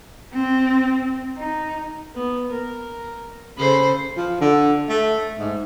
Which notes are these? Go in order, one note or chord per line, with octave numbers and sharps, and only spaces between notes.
C4
D#4
B3
A#4
C#3 G#4 A4 C5 B5
F3
D3
A3
G#2